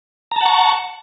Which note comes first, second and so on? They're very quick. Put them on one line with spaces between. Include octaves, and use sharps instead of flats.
A#5 A5 F#5 C#6